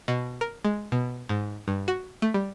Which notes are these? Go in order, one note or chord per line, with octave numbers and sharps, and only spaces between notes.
B2
A#4
G#3
B2
G#2
G2
F#4
A3
G3